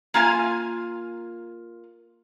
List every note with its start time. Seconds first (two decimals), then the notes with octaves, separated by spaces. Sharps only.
0.14 A#3 F4 G#5